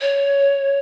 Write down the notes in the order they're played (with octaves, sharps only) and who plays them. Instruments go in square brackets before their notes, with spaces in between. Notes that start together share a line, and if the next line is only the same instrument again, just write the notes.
[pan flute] C#5